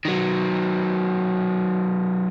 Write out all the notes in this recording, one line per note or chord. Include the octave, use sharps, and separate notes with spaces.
D#3 F#3